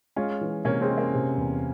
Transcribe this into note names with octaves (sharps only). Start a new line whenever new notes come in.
G#3 C#4 F4
E3
C3 A#3 C#4
G#3 C4
C#4
A#3
C3
E2